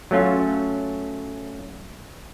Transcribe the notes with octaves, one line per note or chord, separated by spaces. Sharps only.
F#3 A3 C#4 F4